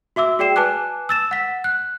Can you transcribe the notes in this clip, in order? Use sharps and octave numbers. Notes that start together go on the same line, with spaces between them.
F#4 E5 D6 E6
F#4 G#4 D5 G5 C7 E7
B4 G#5 A5 D6 F#6
E6 A6 E7
F#5 B6
F#6